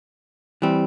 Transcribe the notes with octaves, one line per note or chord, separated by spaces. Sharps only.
E3 G3 C4